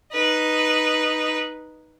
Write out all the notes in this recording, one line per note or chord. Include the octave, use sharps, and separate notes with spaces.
D#4 B4